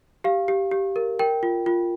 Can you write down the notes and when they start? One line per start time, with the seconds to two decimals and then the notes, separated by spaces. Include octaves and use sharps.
0.24 G4 F5
0.48 G4
0.71 G4
0.96 A#4
1.19 A#4 G5
1.43 F4
1.66 F4